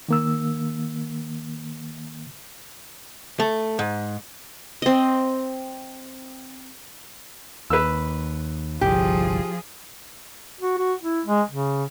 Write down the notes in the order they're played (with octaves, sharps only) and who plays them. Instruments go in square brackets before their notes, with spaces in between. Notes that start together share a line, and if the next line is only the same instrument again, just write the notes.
[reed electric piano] D#3 A#3 E6
[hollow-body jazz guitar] A3
G#2
[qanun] C4 D#5
[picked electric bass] D#2 [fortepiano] B4 E6
[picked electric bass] G1 C2 [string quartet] F3 F4 G#4 [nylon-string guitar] G4
[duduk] F#4
F#4
E4
G#3
C#3